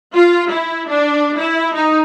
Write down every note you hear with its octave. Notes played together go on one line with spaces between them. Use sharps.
F4
E4
D4
E4
D#4